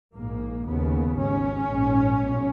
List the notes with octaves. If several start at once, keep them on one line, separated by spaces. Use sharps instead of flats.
A#1 G#2 A#3
D#2 C#3 B3
G#1 G#2 C#4
A#1 G#2
B1 A#2